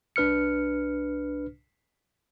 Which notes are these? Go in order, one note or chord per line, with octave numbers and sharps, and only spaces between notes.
C2 D4 B4 F6 C#7